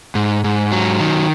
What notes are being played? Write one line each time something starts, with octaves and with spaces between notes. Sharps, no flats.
G#2
G#2
F#3
D#3